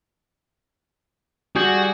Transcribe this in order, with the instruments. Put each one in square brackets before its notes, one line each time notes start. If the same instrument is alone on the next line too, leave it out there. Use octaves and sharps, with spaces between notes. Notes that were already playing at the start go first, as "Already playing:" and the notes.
[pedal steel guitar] G3 G#4 G6 [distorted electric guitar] F#4